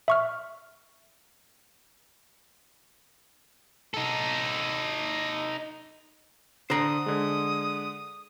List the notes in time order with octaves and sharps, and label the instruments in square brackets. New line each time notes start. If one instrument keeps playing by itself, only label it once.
[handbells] E5 C#6 F6
[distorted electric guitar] D#4 A4
[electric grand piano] D3 [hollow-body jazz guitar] C5 A#5 [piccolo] D#6
[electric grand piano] D3 G#3